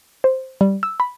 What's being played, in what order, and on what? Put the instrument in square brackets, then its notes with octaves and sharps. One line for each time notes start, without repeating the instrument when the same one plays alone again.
[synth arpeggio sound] C5
G3
E6
B5